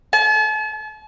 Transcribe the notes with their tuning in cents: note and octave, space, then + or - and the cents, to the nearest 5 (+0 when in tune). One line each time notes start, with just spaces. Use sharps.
A5 -40